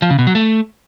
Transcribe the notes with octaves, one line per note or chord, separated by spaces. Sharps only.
F3
C#3
B2
F#3
A3